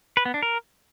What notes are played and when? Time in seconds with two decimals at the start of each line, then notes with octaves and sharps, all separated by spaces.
0.17 B4
0.25 B3
0.34 D4
0.43 A#4